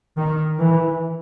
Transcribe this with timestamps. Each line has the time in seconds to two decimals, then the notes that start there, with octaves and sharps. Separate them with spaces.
0.17 D#3
0.60 E3